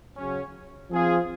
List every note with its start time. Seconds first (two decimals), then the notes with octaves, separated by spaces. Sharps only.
0.17 C#3 F#3 C#4
0.91 F3 C4 F4 G#4